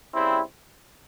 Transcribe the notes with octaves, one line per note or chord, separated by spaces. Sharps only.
C#3 G3 C4 E4